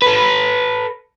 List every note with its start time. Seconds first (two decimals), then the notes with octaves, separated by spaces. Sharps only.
0.02 A4 B4